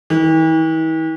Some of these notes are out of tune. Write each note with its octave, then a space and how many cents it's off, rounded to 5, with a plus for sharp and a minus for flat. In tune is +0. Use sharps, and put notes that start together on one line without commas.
E3 -45